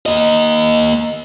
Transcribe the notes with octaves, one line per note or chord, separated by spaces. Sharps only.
A#3 D#5